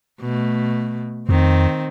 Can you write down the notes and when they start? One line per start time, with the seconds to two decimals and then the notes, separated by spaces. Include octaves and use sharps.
0.20 B2 A3
1.29 F2 D#3 C4